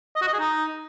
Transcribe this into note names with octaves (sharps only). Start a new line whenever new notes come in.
D#5
F#4
D#5
G#4
D#4